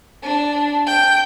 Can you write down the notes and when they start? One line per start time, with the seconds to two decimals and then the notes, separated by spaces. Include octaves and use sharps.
0.23 D4
0.87 G5 G6